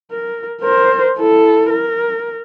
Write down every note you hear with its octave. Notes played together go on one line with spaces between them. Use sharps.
A#4
A#4 C5
E4 A4
A#4